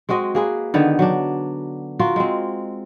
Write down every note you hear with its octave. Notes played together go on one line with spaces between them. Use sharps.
G#3 C4 F#4 D#5
A#3 G#4 B4
D3 D#3 B3
F#3 D4
F4 F#4 A#4 F5
G#3 C4